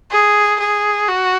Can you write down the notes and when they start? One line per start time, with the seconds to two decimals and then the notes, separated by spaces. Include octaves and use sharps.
0.11 G#4
0.60 G#4
1.09 F#4